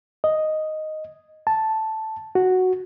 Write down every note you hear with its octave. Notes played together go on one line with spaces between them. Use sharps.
D#5
A5
F#4